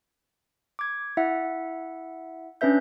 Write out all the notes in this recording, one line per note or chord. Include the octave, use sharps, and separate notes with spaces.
D6 G#6
E4 E5 F#5
C#4 D4 B4 E5 G6